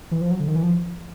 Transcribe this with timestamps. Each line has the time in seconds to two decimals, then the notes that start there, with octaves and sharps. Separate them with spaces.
0.11 E3
0.21 F3
0.31 F#3
0.40 D3
0.48 D#3
0.56 E3
0.63 F3